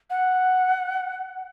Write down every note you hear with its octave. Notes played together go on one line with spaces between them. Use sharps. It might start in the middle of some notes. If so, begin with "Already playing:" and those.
F#5